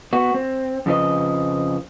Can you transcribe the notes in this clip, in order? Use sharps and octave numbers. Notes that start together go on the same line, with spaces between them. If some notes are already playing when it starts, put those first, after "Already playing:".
B3 F#4
C4
F2 C#3 F3 B4 D#5